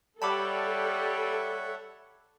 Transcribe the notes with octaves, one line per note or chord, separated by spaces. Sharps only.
G3 A4 C#5 E5 F#5 A5 B5 D6